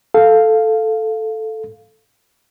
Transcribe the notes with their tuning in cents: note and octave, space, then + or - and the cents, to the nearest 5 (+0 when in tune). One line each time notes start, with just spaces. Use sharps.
A4 +0 F5 +0